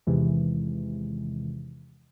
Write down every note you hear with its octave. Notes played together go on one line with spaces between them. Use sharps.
E2 C3 D#3 E3 G#3